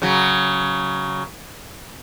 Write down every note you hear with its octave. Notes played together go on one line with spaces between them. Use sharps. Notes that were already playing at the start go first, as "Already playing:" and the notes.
C#3 F#3